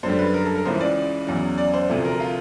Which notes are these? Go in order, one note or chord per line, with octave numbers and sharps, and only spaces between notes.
F#2 D3 G3 C5
B4
A#4
A4
A#4
C#2 C#3 E3 C5
D5
E2 C#3 F#3
D5
C5
D2 C3 F3 A3
A#4
F4